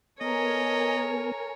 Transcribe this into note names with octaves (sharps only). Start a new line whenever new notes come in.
B3 A4 A#4 C#5 D#5 G#5